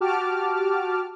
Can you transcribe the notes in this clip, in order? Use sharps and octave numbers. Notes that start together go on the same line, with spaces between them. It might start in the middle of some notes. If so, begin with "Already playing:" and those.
F#4 G4 A5 D6 F6